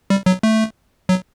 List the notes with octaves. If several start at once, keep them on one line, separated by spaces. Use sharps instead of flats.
G3
F#3
A3
F#3